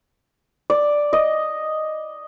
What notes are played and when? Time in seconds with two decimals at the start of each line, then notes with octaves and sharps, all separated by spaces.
0.70 D5
1.13 D#5